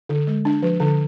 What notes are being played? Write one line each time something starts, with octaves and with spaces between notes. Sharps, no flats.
D3
G#3
D4
F3
D3